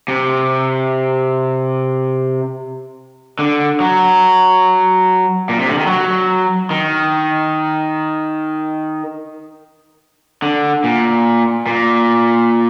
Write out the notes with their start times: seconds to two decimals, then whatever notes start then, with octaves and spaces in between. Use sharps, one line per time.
0.08 C3
3.39 D3
3.80 F#3
5.49 A#2
5.60 C3
5.68 D3
5.78 D#3
5.87 F#3
6.71 D#3
10.42 D3
10.84 A#2
11.66 A#2